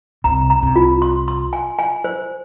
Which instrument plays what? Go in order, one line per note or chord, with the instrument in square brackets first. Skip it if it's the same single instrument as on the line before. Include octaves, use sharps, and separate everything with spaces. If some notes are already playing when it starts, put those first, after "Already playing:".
[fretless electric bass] C2 C3 [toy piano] A#5
[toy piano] A#5
[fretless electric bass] C2 C3
[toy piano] F4
C6
C6
G#5
G#5
C5